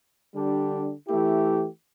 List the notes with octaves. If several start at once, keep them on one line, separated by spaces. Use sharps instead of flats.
D3 G3 D4 G4
E3 A3 E4 G4